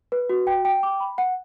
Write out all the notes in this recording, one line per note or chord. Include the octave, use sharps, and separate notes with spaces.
B4
F#4
G5
G5
D6
B5
F#5